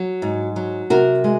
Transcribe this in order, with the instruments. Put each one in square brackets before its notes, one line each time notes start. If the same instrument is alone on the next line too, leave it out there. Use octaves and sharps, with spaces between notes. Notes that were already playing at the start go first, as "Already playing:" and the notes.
Already playing: [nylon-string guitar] F#3
G#2
F#3
C3 F#4 A#4
G#3